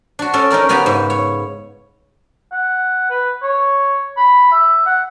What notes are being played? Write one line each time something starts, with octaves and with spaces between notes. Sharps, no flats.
D4 F#4
C#4 A4 D5
C#4 D#4 A#4 D5
C#3 B3 G4 G#5 A#5
G#2
C#5
F#5
B4
C#5
B5
E5
F#5